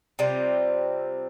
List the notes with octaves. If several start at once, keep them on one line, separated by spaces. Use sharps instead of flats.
C3 G3 C4 F4